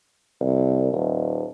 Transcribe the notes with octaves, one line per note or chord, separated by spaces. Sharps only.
C2
D#1